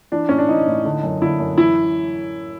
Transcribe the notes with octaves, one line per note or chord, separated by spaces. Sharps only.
E3 D4
A2 C#4
D4
E3 D#4
A2
D3
F#2
D3 E4
F#2
E3 E4